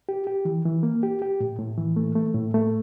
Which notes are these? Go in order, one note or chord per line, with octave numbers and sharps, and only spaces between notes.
G4
G4
E3
E3
A#3
G4
G4
A2
A2
E3
A3
A3
A2
A3